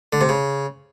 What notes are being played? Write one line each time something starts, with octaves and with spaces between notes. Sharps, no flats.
D3
C3
C#3